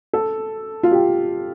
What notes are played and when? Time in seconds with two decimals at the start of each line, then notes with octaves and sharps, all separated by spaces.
0.13 A4
0.83 F4
0.92 G4